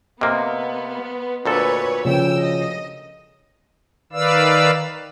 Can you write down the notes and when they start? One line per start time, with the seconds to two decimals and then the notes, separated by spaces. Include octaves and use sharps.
0.21 C3 A#3 B3 D#5 C6 F6
1.46 D2 A#2 A4 B4 C#5
2.05 C#3 F3 C#4 G5 E6
2.40 D#5
4.13 D#3 B4 D5 F5 E6